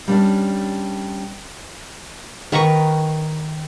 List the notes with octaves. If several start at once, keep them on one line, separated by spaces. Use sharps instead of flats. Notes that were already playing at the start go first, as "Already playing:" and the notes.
G3 C#4 D4
D#3 B4 A#5 C#6